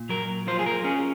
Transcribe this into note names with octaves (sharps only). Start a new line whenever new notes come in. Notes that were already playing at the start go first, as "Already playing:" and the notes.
Already playing: A#2
F#3 A#4
F4 C5
G#4
A#4
C#4 G#4